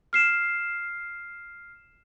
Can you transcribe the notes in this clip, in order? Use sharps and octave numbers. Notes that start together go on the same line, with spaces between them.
F6 C7 E7